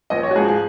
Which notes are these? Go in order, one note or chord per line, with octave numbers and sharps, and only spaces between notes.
A#1 D#5
C#5
F#4
G#2 F3 G#4
G#4